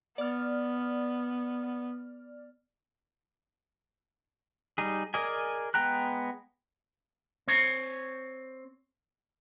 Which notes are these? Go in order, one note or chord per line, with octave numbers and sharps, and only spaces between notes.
B3 D5 F6
G3 D#4 G#4
G#4 A#4 D5 D#5 G#5
G#3 B3 G5 A#5 F#6
C4 C#5